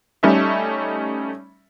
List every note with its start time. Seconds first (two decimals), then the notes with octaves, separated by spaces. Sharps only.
0.23 G3 A3 C#4 D#4 D5 E5